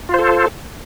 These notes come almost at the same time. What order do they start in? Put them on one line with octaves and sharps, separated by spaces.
F4 C5 A4